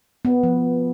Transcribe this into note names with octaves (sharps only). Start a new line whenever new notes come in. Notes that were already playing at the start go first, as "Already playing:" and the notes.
B3
F3